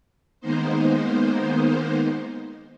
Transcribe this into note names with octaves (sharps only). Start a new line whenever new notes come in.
D#3 G#3 A#3 B3 D#4 C5